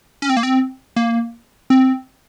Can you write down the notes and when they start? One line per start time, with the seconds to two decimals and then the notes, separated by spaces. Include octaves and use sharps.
0.22 C#4
0.29 C4
0.37 A#3
0.43 C4
0.96 A#3
1.70 C4